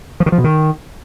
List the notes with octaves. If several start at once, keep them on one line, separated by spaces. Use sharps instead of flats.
F3
D#3
F3
B2
D#3